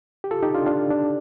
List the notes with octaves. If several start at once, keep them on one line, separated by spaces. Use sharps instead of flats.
G4
F4 A4
D#4 G4
D4 F4
D4 F4
D4